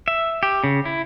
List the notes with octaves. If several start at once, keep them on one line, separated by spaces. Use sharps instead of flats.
E5
G4
C#3
E4